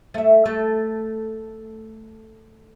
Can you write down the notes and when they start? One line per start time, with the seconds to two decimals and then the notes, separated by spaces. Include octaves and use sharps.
0.14 A3 E5
0.45 A3